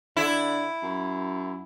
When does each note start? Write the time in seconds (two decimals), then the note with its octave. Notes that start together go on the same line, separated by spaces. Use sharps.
0.17 D3 E4
0.83 F#2